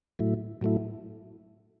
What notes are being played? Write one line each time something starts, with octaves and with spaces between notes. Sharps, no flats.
A2 F#3 A3 E4
A2 F#3 A3 E4